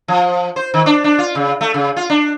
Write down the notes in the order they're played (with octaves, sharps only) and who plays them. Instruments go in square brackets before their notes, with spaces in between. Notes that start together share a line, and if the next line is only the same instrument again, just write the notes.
[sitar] F3
C5
D#3
D4
D4
F4
C#3
A3
C#3
F4
D4